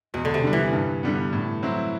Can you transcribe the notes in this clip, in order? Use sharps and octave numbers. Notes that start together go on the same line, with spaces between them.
E2 B2
D3
C3
D3 G3
E3
G2
D3 G3 B3
A2
F#3 C4 E4